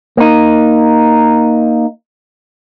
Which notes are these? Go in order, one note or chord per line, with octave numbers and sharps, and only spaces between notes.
A#3 D#4